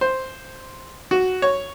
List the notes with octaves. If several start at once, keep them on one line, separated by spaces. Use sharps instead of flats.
C5
F#4
C#5